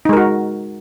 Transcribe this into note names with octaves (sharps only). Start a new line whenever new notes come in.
G#3 D#4 F#4 A#4